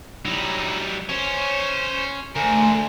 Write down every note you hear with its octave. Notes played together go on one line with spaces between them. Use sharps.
F#3 G3 D#4 E4
C#4 C5 C#5
D2 A3 A#4 C5 G#5